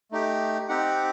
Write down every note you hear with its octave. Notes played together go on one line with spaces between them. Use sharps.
A3 D#4 G4
C4 D#4 G4 F#5